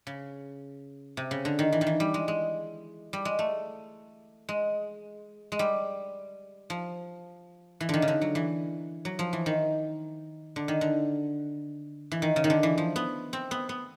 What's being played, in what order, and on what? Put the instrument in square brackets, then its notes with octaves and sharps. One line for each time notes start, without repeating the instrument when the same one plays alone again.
[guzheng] C#3
C3
C#3
D3
D#3
E3
D#3
E3
G3
G#3
G#3
G3
G#3
A3
G#3
G#3
G3
F3
E3
D3 D#3
C#3
D3
F#3
E3
F#3
F3
E3
D#3
D3
D#3
D3
E3
D#3
C#3
D#3
D3
E3
F3
B3
C4
B3
B3